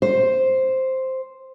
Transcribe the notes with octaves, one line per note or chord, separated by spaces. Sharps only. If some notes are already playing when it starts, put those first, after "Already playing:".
C5